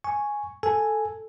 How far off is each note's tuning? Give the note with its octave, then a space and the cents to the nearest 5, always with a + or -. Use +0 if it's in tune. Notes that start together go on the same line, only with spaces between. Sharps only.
G#5 +0 C#6 +0
A4 +0 G#5 +0